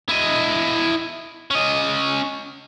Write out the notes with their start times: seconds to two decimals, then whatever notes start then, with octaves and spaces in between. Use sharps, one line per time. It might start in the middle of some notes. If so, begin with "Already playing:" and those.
0.09 E4 D#5
1.51 C#4 D#5